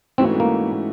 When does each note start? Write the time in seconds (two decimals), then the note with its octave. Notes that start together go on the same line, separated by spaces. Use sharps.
0.18 G#2 E3 A3 C4 C#4 F#4
0.40 A#3